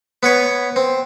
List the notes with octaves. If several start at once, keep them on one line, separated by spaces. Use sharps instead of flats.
B3 B4 C#5
C4